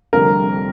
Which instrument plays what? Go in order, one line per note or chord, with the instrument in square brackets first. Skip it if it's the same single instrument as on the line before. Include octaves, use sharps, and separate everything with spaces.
[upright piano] F1 F2 D3 G3 A#4